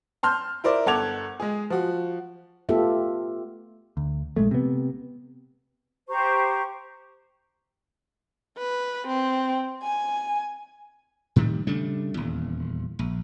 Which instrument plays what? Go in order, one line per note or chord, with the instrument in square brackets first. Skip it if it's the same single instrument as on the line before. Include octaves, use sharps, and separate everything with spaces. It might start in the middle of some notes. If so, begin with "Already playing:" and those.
[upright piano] A5 C6 F6 G6
E4 A#4 C5 D5
G1 A4 F#5 D6 G#6 F7
G#3 G#4
F3 F#4
[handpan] A3 B3 F4 G4 A4 E5
[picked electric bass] D2
A#1 G#3 A3
C3 B3
[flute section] G4 C5 A#5 C#6
[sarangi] B4
C4
G#5
[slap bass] A2 D#3 E3 G3
C#3 G3 A3 D4
D#1 E2
A#1